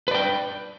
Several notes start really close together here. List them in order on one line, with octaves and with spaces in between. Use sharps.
B4 D5 G5